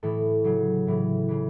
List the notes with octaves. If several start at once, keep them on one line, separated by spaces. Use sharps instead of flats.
A2 E3 A4
C#3 F#3
A2 E3
C#3 E3